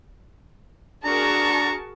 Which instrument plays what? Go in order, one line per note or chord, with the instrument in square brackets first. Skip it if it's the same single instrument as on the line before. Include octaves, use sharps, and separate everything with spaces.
[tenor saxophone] D4 [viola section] F#4 G#4 A#4 [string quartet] A5 C#6 [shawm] A#5